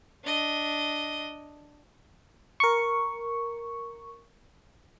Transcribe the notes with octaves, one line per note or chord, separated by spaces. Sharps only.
D4 D#5
A#4 C#6